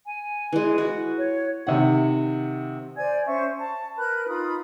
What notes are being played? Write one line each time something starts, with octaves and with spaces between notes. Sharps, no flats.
G#5
E3 G#3
F#4
C#5
C3 D#3 F#5
C5 D5 G#5 G#6
C#4 C5 E5 C#6
A5
A#4 B4 B5 F#6
D#4 F4 B5 D#6